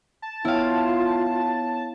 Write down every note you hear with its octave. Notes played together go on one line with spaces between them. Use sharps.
A5
B3 E4 F4 C#5 F5 G5